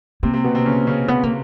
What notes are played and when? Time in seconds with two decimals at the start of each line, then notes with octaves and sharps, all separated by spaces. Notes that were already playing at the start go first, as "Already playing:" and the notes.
0.23 C3 A#3 C4
0.34 C3 C4
0.44 B2 B3
0.55 C3 C4
0.66 C#3 C#4
0.87 C#3 C#4
1.08 B3
1.23 A#3